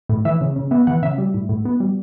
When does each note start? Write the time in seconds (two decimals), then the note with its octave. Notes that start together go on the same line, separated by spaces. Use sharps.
0.09 A2
0.25 E3 E5
0.41 C#3
0.56 C#3
0.71 B3 E5
0.87 E3 F#5
1.03 C#3 E5
1.18 G3
1.34 A2
1.49 A2
1.65 B3
1.80 G3